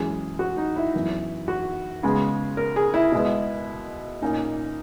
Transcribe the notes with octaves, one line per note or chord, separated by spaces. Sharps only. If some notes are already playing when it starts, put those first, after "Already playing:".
Already playing: F#2 E3 G#3 C#4 G#4
F#4
D#4
E4
F#2 E3 B3
F#4
C#3 G#3 B3
A#4
G#4
E4
B2 G#3 B3
A#2 A#3 C#4 D#4